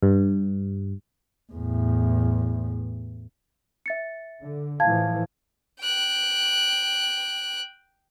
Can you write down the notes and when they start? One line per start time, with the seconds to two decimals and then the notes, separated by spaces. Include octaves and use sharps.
0.03 G2
1.53 E2 A2
3.86 E5 A6 C#7
4.40 D3
4.80 A2 E3 F3 F5 A5 G#6
5.80 G5 F#6